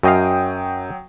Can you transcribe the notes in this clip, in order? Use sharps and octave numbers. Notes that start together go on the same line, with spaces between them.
F#2 F#3 D#5 F5 G5 D#6